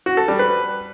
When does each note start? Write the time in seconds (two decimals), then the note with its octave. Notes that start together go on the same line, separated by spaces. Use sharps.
0.06 F#4
0.17 A4
0.28 G3
0.39 B4